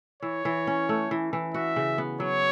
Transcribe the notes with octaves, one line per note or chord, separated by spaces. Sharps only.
E3 C#5
E3
C#4
A3
E3
E3
F#4 E5
C#3
B3
F#3 C#5